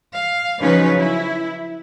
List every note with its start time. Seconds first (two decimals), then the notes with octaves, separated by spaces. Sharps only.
0.13 F5
0.60 C#3 F3 F#3 C#4 D#4 B4
0.97 E4